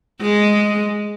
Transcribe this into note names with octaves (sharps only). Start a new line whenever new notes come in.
G#3